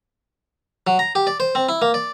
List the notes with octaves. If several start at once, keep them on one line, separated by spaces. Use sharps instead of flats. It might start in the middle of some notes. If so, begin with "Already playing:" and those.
F#3
A#5
G4
D5
C5
C4
E4
A#3
D5